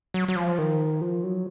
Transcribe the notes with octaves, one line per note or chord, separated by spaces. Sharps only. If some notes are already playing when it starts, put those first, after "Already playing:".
F#3
F#3
F3
D#3
F3
F#3